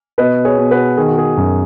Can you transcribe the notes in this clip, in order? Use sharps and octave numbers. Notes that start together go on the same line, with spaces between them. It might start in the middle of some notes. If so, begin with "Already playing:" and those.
B2 B4 D#5
G#4 C#5
B2
F#4 B4
D#3 G#4
F#4
G#4
F#2